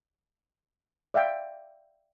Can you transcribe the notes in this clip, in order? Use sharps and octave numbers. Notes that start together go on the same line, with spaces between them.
D5 E5 F5 G5